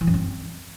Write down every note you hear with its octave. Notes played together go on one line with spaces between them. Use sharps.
E3
F#2
C4